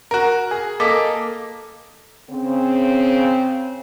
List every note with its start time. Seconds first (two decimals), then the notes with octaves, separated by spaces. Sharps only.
0.11 F#4 A#4
0.51 G#4
0.80 A#3 A4 D#5 D6 B6
2.30 C#3 C4